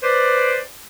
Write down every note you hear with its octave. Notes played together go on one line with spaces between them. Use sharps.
B4 C5 D5